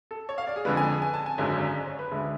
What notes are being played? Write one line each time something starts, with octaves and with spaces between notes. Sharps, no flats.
A4
C#5
F5
D5
G#4
F2 D3 G#3 B4
G#5
A5
G#5
A5
G#5
G#1 F#2 D3 G#3
D5
C#5
B4
D2 D3 G#3